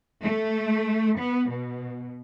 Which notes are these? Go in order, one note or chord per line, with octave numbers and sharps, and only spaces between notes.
A3
B3
B2